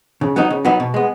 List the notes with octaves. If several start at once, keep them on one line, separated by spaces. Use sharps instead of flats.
C#3
F#3 B3 D#4 F#4
C#3
F#3 B3 D#4 F#4
B2
G#3 B3